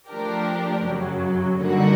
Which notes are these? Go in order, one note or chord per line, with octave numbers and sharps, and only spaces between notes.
F3 A3 D4 G4 A#4
F#2 C#3 F#3
D3 G3 A#3 D#4 F#4